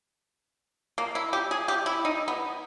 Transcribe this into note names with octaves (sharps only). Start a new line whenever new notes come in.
A#3
E4
G4
G#4
G4
E4
D#4
B3